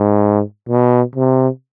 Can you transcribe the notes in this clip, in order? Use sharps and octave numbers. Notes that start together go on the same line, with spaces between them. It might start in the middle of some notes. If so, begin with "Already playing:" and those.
Already playing: G#2
B2
C3